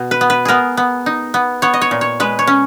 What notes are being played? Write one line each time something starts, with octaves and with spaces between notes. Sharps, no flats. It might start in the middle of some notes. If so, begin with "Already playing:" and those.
Already playing: B2
B4
B3
B4
B3 G#4 A#4
B3
D#4
B3
B3 C#5
D#5
C#5
A#2
C#5
G#3 B4
C#5
C#4